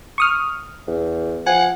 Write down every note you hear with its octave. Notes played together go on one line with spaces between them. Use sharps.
C#6 D#6 F6
E2
F3 F#5 G#5